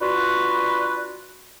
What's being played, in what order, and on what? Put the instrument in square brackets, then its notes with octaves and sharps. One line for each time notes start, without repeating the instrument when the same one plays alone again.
[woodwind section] D4 F4 F#4 B4